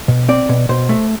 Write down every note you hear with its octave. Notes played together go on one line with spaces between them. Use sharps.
B2
C4 D5
B2
B2 C5
A3